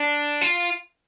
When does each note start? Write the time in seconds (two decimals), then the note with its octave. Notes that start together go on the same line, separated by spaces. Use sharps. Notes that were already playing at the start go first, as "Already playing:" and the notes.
Already playing: D4
0.41 F4